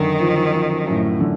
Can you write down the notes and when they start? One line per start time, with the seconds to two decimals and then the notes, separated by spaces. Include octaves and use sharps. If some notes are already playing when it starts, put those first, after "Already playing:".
Already playing: F#2 D3 D#3
0.20 F3
0.53 F3
0.87 F#2 A2
1.20 D3